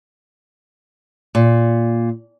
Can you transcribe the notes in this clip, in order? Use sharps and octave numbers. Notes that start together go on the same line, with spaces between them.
A#2